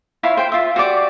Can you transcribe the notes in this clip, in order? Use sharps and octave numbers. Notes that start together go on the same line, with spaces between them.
E4 F4 C#5 F5
C5 G5
F4 E5
F#4 G4 D5